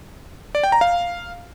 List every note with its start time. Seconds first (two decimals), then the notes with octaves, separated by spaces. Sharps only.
0.55 D5
0.63 G5
0.72 A#5
0.81 F5